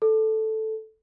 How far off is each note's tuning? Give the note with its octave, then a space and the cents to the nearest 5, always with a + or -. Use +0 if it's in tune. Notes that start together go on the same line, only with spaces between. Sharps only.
A4 -5